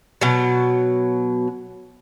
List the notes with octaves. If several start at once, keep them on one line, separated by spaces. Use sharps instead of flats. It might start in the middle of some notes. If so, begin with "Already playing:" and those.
B2 F#3